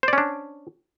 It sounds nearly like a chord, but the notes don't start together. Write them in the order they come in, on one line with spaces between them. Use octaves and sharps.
C5 D5 C#4 D4